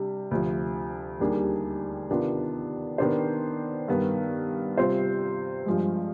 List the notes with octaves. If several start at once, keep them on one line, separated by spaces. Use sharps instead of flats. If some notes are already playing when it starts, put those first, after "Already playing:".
Already playing: C3 G3 D4
D2 C3 F3
D#2 D#3 G3 D4 G#4
C3 D#3 B3 D4 F4
D#3 B3 D4 G4 C5
G2 D#3 B3
C3 G3 C4 F4 C5
G2 F3 G#3